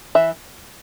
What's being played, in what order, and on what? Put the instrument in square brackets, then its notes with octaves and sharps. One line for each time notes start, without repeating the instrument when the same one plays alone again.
[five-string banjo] E3 E5